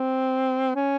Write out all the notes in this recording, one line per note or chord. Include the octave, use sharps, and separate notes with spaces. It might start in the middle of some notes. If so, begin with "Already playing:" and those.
Already playing: C4
C#4